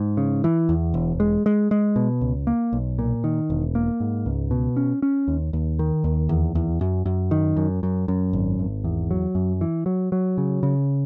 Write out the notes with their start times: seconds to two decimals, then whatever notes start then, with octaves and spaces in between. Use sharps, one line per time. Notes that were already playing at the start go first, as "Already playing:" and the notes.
Already playing: G#2
0.17 C#3
0.44 E3
0.69 E2
0.94 E1
1.20 G#3
1.46 G#3
1.71 G#3
1.96 B2
2.21 C#2
2.47 A#3
2.73 B1
2.99 A#2
3.24 D#3
3.50 E1
3.75 A#3
4.00 G#2
4.26 C#2
4.51 B2
4.77 C#4
5.02 C#4
5.28 D#2
5.53 D#2
5.79 D#3
6.04 D#2
6.29 E2
6.55 E2
6.81 F#2
7.05 F#2
7.31 D#3
7.57 F#2
7.83 F#2
8.08 F#2
8.33 G#1
8.59 G#1
8.84 E2
9.11 F#3
9.35 F#2
9.61 E3
9.86 F#3
10.12 F#3
10.38 C#3
10.63 C#3